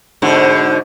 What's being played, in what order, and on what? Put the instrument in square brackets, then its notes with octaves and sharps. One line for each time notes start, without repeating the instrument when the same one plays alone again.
[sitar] G#2 B2 D3